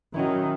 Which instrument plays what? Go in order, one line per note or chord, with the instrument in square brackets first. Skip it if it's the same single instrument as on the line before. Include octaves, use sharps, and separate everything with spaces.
[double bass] D#3 [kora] F#3 C#4 E4